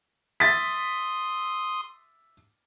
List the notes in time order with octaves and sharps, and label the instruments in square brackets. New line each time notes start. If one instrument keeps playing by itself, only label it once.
[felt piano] E5 A6 B6 [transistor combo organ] C6 D#6